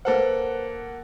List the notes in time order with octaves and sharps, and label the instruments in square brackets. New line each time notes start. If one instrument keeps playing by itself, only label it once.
[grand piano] A#3 A4 F#5 [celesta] B4 C5